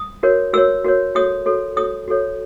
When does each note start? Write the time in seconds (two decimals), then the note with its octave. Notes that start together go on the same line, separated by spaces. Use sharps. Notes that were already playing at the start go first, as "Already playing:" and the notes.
Already playing: D#6
0.23 F#4 A#4 C#5
0.53 F#4 A#4 C#5 E6
0.84 F#4 A#4 C#5
1.15 F#4 A4 C#5 D#6
1.46 F#4 A4 C#5
1.76 F#4 A4 C#5 D#6
2.08 F#4 A4 C#5